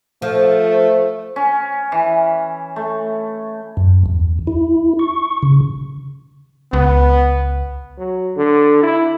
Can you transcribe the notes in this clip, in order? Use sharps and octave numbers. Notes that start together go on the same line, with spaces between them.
F3 A3
C#4
E3
A3
F#2
E2
E4
C#6
C#3
C#2 B3
F#3
D3
E4